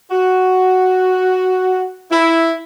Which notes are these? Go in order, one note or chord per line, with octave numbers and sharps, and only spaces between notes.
F#4
E4